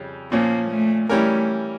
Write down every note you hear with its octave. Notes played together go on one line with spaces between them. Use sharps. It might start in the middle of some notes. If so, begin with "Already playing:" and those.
Already playing: F2 C#3 G3 C#4
A#2 F3 A#3 C#4
A3
E3 G3 A3 C#4 G4 A#4